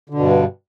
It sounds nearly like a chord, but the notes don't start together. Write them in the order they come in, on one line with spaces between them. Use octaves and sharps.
D3 B2 G2